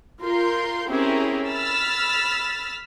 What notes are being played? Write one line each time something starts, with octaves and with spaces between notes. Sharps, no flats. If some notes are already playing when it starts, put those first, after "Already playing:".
F4 A#4 C6 G6
C4 C#4 E4 G4 G#4 A#4
B5 E6 F6 A6 B6